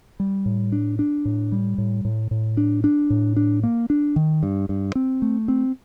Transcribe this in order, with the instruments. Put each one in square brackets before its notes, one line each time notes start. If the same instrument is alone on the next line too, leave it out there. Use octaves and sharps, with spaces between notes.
[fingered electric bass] G3
A2
D4
D4
A2
G3
A2
A2
A2
D4
D4
A2
D4
A#3
D4
D#3
G2
G2
C4
A3
C4